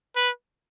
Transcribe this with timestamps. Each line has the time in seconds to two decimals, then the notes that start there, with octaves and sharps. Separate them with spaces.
0.16 B4